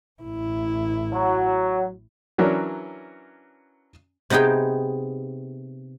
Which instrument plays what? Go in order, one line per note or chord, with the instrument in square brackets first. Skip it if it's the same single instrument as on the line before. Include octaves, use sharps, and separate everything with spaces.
[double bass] A1 E4
[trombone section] F#3
[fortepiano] E3 F#3 C#4 D4 A#4
[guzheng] C3 B3 D#4 G#4 G5